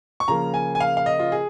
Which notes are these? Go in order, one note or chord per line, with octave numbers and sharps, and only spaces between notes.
C#6
C#3 F3 A#3 A#5
G#5
G#5
F5
F5
D#5
F4
G#4